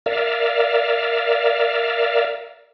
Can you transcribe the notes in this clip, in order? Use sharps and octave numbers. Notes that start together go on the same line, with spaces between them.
A#4 D5 E5 F5